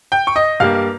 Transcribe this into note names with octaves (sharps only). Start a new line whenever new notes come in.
G5 G6
C#6
D#5 D#6
G2 G3 A#3 F5 F6